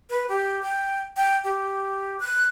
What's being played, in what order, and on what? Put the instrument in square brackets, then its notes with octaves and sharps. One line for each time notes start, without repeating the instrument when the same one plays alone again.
[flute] B4
G4
G5
G5
G4
F#6